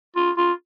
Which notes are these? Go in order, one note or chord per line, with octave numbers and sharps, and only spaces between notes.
F4
F4